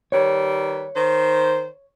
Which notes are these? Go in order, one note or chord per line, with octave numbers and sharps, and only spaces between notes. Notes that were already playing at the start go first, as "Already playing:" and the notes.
D#3 G3 B4 C#5
D#3 C5